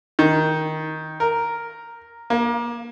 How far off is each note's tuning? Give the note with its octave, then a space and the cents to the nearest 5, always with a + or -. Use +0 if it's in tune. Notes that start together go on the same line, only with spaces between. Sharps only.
D#3 +10
A#4 +0
A#3 +30